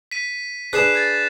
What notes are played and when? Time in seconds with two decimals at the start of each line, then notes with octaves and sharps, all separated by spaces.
0.11 B6 D#7
0.73 D4 G#4 B4 F#6 C7 E7
0.95 G#6 A6